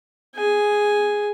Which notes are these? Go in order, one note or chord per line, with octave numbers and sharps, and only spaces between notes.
G#4 G#5